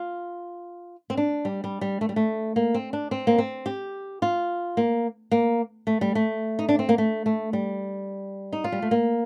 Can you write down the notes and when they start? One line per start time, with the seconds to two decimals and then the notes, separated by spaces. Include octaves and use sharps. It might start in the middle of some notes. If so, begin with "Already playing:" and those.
Already playing: F4
1.10 C4
1.17 D4
1.45 G3
1.64 G3
1.81 G3
2.01 A3
2.09 G3
2.16 A3
2.56 A#3
2.74 C4
2.93 D4
3.11 C4
3.27 A#3
3.38 C4
3.66 G4
4.22 F4
4.77 A#3
5.31 A#3
5.87 A3
6.01 G3
6.15 A3
6.59 D#4
6.69 D4
6.79 C4
6.89 A#3
6.98 A3
7.26 A3
7.53 G3
8.53 D#4
8.64 F4
8.72 G3
8.82 A3
8.91 A#3